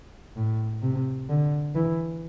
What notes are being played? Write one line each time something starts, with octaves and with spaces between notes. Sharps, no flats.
A2
C3
D3
E3